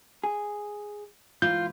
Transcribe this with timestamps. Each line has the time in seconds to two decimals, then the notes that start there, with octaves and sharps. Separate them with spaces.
0.24 G#4
1.42 G#2 E3 F4 G6